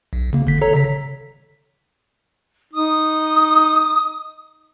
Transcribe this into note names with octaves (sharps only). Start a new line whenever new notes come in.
B1
C#3 A#3
G1 D3 B6
A4 C#5 A#5
C#3 B6
D#4 D#6